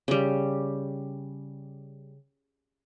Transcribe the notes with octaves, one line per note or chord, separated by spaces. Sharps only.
C#3 G3